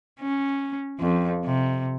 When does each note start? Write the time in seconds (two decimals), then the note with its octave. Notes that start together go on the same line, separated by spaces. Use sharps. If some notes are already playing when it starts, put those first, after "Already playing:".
0.21 C#4
1.00 F2
1.45 C3